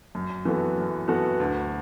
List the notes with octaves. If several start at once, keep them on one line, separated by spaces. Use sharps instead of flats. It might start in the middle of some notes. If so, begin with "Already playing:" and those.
F#2
E3 B3 F#4 A4
F#2
E3 B3 F#4 A4
D2